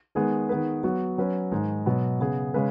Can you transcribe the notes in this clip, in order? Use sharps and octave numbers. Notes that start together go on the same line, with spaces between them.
D#3 G#3 B3 G#4
D#3 B3 G#4 B4
F#3 B3 F#4
F#3 C#4 B4
G#2 D#3 G#3 D#4
B2 F#3 B3
C#3 B3 G#4
C#3 G#3 C#4 G#4 B4